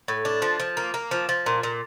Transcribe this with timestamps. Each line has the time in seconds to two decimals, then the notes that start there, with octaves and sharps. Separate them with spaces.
0.08 A2
0.25 D4
0.42 F3
0.60 F3
0.77 A#3
0.94 A#3
1.11 F3
1.29 F3
1.46 A#2
1.63 A#2